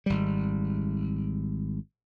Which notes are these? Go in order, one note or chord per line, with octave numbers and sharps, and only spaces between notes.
G#1 G3